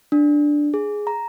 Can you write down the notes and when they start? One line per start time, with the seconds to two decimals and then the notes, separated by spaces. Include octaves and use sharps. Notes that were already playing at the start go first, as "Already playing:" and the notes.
0.12 D4
0.74 G#4
1.07 A#5